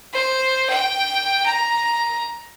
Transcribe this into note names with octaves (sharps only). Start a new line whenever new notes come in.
C5
G5
A#5